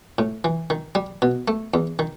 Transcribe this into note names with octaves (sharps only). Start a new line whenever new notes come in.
A2
E3
D#3
G3
B2
A3
E2
D#3